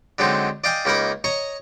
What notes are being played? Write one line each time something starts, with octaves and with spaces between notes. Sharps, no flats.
D3 F#3 G#3 C4 D#4
D5 D#5 F5 G5 G#5 D6
C#2 A#3 D#4 A#4 B5
C#5 D#5 A#5 C#6